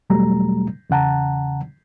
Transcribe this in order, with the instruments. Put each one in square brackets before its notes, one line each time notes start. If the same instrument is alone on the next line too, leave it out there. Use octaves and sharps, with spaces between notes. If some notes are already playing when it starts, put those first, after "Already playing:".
[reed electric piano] E2 B2 F#3 G3 A3 A#5
E2 C#3 F#5 A5 A#5